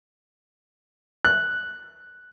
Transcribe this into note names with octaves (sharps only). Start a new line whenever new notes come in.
F#6